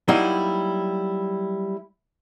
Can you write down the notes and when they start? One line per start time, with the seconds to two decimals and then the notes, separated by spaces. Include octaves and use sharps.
0.08 F#3 G3 A#3 D#4 E4